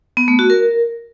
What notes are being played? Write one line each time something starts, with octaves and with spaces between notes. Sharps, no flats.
B3
A3
F#4
A#4